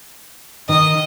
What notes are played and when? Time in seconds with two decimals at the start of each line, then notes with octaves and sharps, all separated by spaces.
0.69 D#3 D#5